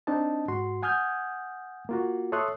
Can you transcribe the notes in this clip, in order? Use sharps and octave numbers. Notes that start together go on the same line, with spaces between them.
C4 D4 D#4 D#5 A5
G#2 F#4 C6
F#5 G#5 D#6 F6 G6 G#6
A#3 F4 F#4
A4 C#5 E5 C6 D#6 F#6